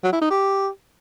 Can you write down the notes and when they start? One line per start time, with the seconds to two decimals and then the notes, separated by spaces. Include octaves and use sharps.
0.04 F#3
0.13 E4
0.22 D#4
0.30 G4